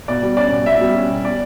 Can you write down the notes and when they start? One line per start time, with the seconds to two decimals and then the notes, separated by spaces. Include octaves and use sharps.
0.08 B2 D5
0.22 G3
0.37 C#4 D5
0.51 B2
0.66 B2 E5
0.81 G3
0.96 C#4
1.10 B2
1.25 D5